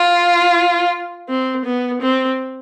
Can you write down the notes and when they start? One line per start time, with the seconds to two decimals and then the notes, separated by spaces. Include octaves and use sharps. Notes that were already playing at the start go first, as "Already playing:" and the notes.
Already playing: F4
1.29 C4
1.66 B3
2.02 C4